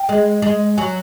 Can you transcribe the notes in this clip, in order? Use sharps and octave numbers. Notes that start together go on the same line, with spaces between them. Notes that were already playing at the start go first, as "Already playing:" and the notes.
Already playing: G5
G#3
G#3
F#3 G#5